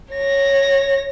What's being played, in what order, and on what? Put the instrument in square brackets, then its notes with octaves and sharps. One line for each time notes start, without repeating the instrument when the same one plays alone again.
[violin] C#5 A#6